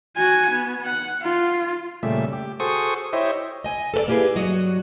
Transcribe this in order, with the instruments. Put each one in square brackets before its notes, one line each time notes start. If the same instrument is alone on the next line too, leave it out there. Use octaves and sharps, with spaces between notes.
[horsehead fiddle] F#4 G#5
B3
F#5
F4
[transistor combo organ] A#2 C#3 G3 A3 E5
G4
F#4 G#4 A4 C5 C#6 D#6
E4 G4 C5 C#5 D#5 E5
[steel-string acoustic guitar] D#5 G#5
A4 B4 D5
A#3 E4 G4 G#4 B4
G2 F#3 F#4 D#5